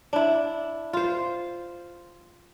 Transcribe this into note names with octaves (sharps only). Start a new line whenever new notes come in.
D4 E4
F4 C5